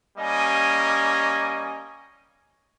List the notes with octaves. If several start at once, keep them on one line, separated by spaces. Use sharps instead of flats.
G3 A#3 C#4 D#5 G#5